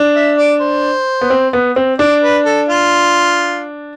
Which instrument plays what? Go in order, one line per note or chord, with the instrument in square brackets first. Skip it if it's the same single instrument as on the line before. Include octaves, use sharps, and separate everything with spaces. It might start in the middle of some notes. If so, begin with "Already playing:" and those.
Already playing: [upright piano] D4
[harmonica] E5
D5
C5
[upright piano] B3
C4
B3
C4
[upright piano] D4 [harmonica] D5
[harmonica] B4
A4
F4